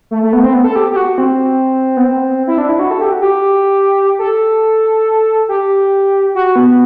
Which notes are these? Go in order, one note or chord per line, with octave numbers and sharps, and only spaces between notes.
A3
A3
B3
C4
B3
A4
G4
G4
F#4
C4
B3
C4
E4
D4
E4
F#4
A4
G4
F#4
G4
A4
G4
F#4
B3